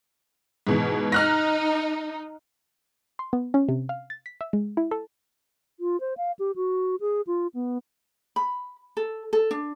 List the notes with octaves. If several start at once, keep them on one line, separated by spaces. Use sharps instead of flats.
G#2 B2 E3
D#4 F6 F#6 A#6
C6
B3
C#4
C3
F5
A6
B6
E5
G#3
E4
A4
F4
C5
F5
G4
F#4
G#4
F4
B3
B5
A4
A4
D4